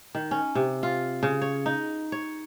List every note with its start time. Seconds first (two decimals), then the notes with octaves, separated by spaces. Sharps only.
0.15 D#3
0.31 C#4
0.55 C3
0.83 F4
1.23 C#3
1.42 C#5
1.66 D#4
2.12 C#5